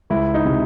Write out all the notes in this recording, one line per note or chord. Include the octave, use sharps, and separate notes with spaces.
C#2 E4
D#4
C3